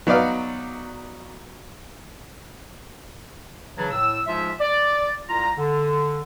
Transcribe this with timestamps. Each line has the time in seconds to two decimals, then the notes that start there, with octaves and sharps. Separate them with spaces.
0.07 F#3 B3 D#4 D5 F5
3.78 C#3 E3 F#3 D4
3.91 A2 E6
4.26 G#2 F3 G#3 F4 E5
4.61 D5
5.29 C2 F4 A#5
5.58 D3